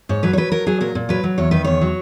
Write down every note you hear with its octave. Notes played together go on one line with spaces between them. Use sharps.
G#2 C#5
F#3 B4
C#5
F#3 B4
F#3 A#4
F#3 G#4
A#2 A#4
A#2
F#3 B4
F#3
E2 C#5
D#3 B4
E2 C#5
F#3